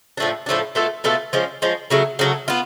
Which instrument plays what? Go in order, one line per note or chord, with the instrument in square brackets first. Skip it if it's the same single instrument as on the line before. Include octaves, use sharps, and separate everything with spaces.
[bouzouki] A2 F3 A3 D4
A2 F3 A3 D4
B2 A3 F4 A4
B2 A3 F4 A4
F3 G#3 C#4
F3 G#3 C#4
C#3 F#3 A3
C#3 F#3 A3
B3 F4